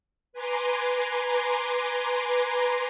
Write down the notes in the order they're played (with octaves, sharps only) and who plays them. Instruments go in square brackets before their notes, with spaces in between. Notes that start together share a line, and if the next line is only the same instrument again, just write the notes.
[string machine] B4 G#5 A#5 C6 D6